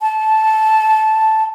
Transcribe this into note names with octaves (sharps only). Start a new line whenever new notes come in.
A5